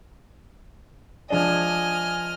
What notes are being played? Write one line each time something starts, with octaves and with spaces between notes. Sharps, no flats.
F3 G#3 D4 D#5 G#5 F6